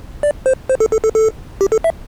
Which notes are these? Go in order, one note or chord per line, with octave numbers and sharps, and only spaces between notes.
D5
C5
C5
A4
A4
A4
A4
G4
A4
E5